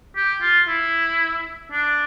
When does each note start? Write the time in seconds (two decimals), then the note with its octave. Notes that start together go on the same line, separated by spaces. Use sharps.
0.16 G4
0.41 F4
0.68 E4
1.72 D4